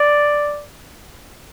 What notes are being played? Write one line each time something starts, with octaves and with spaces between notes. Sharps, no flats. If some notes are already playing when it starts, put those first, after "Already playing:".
Already playing: D5